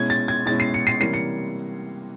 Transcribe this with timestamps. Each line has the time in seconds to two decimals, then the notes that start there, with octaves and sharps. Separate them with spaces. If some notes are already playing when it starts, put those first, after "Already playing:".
Already playing: B2 G#3 C#4 E4 G#6
0.10 A6
0.28 G#6
0.46 B2 G#3 C#4 E4 A6
0.60 C7
0.74 C#7
0.87 C7
1.00 C3 E3 G3 A#3 C#4 C7
1.14 C#7